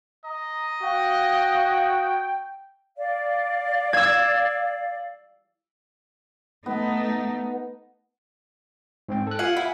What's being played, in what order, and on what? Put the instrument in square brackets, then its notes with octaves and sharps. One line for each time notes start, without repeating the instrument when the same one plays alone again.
[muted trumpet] D#5 [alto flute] A#5
[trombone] F#4 [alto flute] F5 [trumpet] G5
[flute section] D5 F5
[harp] E6 G#6
[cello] A3 D#4 [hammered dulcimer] B3
[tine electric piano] G#2 C4 G5
A4 F#6
[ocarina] F4 [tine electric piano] F5 G#5 [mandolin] F#5
[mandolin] E4 [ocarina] F#5